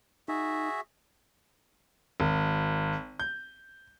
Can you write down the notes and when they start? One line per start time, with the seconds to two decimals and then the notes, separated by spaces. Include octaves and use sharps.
0.28 D#4 F#4 G#4 E5
2.20 G#1
3.20 G6